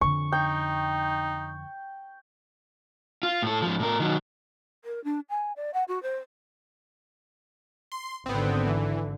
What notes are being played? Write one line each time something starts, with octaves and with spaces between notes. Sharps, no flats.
F2 D3 C#6
D#4 G5
F4
A2 A4
G#2 F3
A2 A#4
D#3 F#3
A#4
D4
G#5
D5
F#5
F#4
C5
C6
G#1 D3 B3 C4
E3